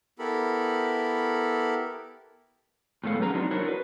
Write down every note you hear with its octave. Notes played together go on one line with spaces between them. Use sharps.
B3 E4 G4 A4 A#4 B5
A2 G#3 B3 A4 C#5 F5
F#3 C#4 G#4 B4 G#5 A#5
F#3 C4 D4 D#4 F#4
D4 E4 F#4 A#4 C5 C#5
B4